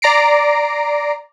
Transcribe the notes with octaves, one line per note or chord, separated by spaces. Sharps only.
D5 A#5 A#6 C7 D7